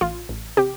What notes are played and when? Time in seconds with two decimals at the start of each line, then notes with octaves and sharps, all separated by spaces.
0.01 A1 F4
0.29 A1
0.57 C3 G4